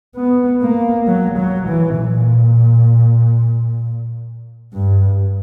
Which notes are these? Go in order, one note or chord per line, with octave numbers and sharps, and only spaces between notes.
B3
A#3
F#3
F#3
E3
A#2
G2